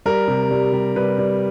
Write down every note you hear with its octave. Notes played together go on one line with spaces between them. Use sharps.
G3 A#4
C3
G3
G3
G3 B4
G3